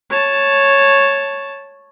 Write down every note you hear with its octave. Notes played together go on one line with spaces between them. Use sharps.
C#5 A5